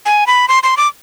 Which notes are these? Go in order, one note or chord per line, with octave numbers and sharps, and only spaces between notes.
G#5
B5
C6
C6
D6